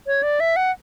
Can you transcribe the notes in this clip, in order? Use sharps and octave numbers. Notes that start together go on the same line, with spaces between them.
C#5
D5
E5
F#5